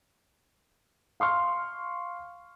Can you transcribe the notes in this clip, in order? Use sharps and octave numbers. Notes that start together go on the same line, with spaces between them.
F5 C6 C#6 F6